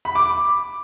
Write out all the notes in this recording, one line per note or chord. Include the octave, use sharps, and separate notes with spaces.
B5
D6
D6